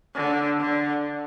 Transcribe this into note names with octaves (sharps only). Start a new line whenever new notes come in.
D3
D3